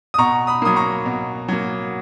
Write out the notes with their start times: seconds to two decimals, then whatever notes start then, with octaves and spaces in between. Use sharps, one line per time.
0.14 D#6
0.18 B2 A#5 C#6
0.47 B5 D#6
0.62 F#3 A#3 D#6
0.76 A#5 C#6
1.05 B2
1.48 F#3 A#3